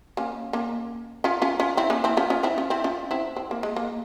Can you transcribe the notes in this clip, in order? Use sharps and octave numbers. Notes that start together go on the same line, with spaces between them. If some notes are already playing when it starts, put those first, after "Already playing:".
A#3 C#4
A#3 C#4
C#4 F4
C#4 F4
C#4 F4
C4 E4
A#3 C#4
C4 E4
C#4 F4
C#4 F4
C4 E4
C#4 F4
C4 E4
C#4 F4
C4 E4
C4
A#3
G#3
A#3